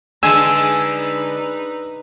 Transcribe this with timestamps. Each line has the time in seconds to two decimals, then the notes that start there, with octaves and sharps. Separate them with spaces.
0.23 D3 G#3 D#4 B4 G#5 A5 E6